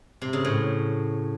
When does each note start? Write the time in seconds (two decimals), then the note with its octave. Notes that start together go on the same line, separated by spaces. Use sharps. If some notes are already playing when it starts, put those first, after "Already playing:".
0.22 C3
0.33 C#3
0.45 A2